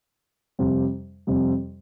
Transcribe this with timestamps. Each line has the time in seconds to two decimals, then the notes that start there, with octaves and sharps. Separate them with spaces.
0.59 F2 C3 G3 C4
1.27 F2 C3 G3 C4